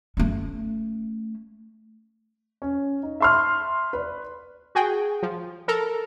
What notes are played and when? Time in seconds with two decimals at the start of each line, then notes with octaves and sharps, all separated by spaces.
0.17 A3 C#4
2.62 C#4
3.03 D#4
3.20 E5 A5 C6 C#6 F6
3.93 B4 D5
4.75 F#4 G#4 G5
5.23 F3
5.68 A4 A#4 A#5